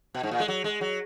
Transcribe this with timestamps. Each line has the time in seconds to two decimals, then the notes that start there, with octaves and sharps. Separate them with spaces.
0.15 B2
0.23 G#2
0.31 A#2
0.40 G#3
0.48 F#3
0.64 G#3
0.81 F#3